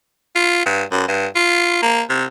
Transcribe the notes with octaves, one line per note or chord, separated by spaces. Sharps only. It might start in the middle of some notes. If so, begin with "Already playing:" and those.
F4
G2
F#2
G2
F4
A#3
C3